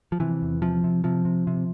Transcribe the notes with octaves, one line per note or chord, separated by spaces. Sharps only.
F3
C3 E3
E2
C3 F3
C3
C3 F3
C3
C3